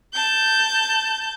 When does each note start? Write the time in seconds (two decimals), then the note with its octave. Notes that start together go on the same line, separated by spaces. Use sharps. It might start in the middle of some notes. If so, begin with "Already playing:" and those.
0.14 A5 G6